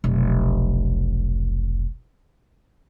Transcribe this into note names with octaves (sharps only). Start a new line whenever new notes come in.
F1 B1